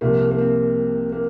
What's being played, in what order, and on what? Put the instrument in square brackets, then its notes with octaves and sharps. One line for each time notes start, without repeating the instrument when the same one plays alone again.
[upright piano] C2 C3 F3 A#3
A#3
C4
A#3